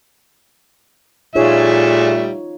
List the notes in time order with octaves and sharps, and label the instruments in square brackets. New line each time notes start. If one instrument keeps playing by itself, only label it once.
[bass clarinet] A#2 [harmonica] G3 A3 E5 [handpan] D#4 F4 C#5 [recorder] G#4